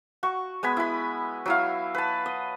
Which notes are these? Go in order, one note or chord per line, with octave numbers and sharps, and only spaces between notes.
F#4 C#6
G#3 B3 G#5 B5
E4 B5
F#3 E4 F5
B4 A5
D#5